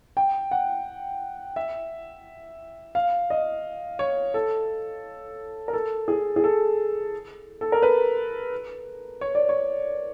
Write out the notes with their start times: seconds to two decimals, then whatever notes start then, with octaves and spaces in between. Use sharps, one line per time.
0.17 G5
0.51 F#5
1.56 E5
2.95 F5
3.30 D#5
3.99 C#5
4.34 A4
5.68 A#4
5.73 A4
6.08 G#4
6.36 G#4
6.44 A4
7.61 A4
7.72 A#4
7.83 B4
9.21 C#5
9.35 D5
9.49 C#5